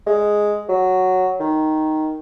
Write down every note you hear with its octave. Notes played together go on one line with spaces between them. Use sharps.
G#3
F#3
D#3